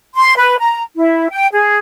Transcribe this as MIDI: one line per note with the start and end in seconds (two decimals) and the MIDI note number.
0.15 0.35 84
0.38 0.58 71
0.59 0.82 82
0.96 1.28 64
1.31 1.46 79
1.53 1.78 68